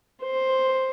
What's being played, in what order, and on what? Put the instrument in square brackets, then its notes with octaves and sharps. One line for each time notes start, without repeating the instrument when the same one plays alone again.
[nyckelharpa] C5